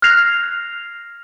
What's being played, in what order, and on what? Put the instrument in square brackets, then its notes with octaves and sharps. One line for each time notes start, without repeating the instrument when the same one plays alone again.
[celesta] F6 F#6 G#6 A#6 C7 F7